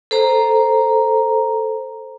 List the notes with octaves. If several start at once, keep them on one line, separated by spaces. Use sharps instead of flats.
A4 C5 A#5